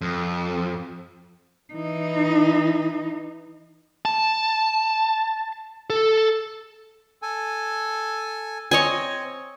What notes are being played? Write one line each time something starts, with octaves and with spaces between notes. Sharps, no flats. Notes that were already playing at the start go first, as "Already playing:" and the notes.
F2
E3 D#4
A5
A4
A4 G#5
C4 C#5 D#5 G#5